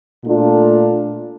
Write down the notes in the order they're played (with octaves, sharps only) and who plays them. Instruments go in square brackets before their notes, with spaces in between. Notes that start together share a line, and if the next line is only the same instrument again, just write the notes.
[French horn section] A#2 A3 D4 F4